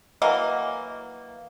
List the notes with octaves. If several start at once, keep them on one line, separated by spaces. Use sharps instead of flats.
E3 F#3 A#3 D#5